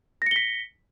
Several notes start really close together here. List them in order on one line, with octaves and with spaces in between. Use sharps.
A#6 C#7 G7 B6